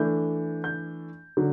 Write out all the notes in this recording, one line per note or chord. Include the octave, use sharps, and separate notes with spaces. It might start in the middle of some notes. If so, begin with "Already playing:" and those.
Already playing: E3 A3 D4 G6
G6
D3 F#3